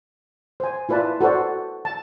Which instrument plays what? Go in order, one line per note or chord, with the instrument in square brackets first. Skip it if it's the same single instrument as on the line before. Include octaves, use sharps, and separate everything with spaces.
[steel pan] C5 G#5
E4 F4 B4 D5 A5
F#4 A4 B4 C5 D5
A5